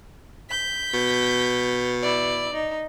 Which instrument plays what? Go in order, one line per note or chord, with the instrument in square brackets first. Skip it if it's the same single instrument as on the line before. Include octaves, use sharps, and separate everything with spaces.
[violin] G6 B6
[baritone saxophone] B2
[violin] E4 D5
D#4